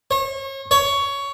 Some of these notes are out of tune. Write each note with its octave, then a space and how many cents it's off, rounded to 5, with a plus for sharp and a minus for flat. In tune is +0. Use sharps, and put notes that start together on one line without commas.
C#5 -35
C#5 +15